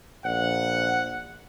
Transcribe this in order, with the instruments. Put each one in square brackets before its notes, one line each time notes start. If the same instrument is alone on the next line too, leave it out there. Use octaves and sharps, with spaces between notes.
[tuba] A#1 [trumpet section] F#5